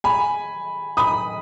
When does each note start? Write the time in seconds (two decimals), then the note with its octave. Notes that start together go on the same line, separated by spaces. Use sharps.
0.04 G#5 B5
0.97 B5 D#6